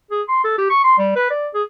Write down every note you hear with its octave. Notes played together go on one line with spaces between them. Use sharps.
G#4
C6
A4
G4
C#6
C6
G3
B4
D5
G#4